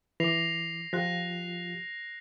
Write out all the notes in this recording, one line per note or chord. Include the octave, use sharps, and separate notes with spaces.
E3 D6 A#6 C7 F7
F3 F4 G4 F#6 A#6